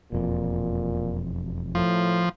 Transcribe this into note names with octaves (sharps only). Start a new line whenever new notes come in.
E1 F2 A#2
A2 F3